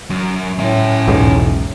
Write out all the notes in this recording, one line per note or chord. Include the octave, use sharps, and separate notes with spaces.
F#2
A2 C#4 E5
B1 E2 G#2